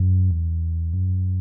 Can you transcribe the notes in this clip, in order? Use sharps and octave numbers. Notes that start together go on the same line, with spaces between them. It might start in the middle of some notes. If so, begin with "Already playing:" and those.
Already playing: F#2
E2
F#2